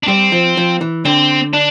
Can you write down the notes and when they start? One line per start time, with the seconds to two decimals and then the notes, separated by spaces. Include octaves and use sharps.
0.03 D4
0.08 G3 C4
0.32 F3
0.57 F3
0.81 E3
1.05 D3 C4
1.54 D4